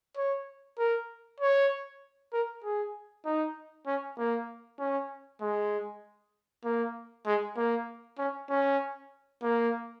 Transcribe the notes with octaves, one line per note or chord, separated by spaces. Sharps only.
C#5
A#4
C#5
A#4
G#4
D#4
C#4
A#3
C#4
G#3
A#3
G#3
A#3
C#4
C#4
A#3